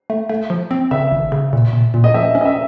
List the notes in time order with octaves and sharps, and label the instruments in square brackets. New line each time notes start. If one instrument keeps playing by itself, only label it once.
[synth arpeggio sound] A3
A3
F3
C4
[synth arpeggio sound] C#3 [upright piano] E5
[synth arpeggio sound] G#1
C#3
A#2
A#2
A#2
[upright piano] D#5
[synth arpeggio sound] F3 [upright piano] E5
[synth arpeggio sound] C#4
[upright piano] D#5
E5